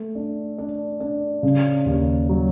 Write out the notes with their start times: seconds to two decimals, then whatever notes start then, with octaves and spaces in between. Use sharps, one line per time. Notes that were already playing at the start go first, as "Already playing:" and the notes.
Already playing: A3
0.15 D4
0.58 D4
1.00 D4
1.43 C#3
1.86 D#2
2.29 F#3